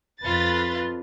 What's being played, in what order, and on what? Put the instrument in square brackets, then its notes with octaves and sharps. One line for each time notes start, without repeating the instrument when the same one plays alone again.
[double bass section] F2 [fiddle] F4 [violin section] B4 A6